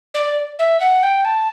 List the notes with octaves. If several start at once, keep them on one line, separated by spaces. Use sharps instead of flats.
D5
E5
F#5
G5
A5